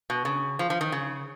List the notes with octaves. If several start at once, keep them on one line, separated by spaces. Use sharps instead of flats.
B2
C#3
F3
F3
D#3
C#3